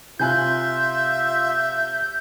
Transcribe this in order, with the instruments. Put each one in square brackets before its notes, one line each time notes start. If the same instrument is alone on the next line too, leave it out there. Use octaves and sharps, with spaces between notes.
[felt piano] C3 G#5 F#6 [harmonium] F4 [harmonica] E5 [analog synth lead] G6